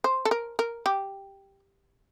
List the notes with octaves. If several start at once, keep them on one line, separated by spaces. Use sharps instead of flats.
C5
A4
A#4
A#4
G4